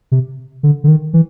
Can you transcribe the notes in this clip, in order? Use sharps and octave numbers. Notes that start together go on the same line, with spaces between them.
C3
D3
D3
D#3
E3